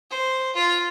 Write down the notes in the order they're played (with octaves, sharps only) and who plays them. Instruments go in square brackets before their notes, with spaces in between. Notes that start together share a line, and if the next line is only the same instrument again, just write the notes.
[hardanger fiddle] C5
F4